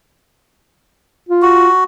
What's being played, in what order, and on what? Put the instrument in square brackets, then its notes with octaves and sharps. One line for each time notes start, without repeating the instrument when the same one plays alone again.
[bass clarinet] F4
[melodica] F#4